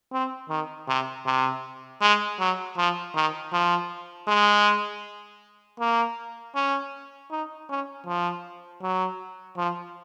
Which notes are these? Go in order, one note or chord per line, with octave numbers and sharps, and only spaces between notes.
C4
D#3
C3
C3
G#3
F#3
F3
D#3
F3
G#3
A#3
C#4
D#4
C#4
F3
F#3
F3